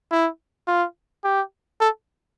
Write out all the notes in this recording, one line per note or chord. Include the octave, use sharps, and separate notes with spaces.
E4
F4
G4
A4